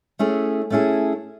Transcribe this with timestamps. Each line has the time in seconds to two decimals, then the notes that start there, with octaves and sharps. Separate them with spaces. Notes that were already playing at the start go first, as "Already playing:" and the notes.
0.19 A3 C#4 E4 G#4
0.70 A3 C#4 E4 G#4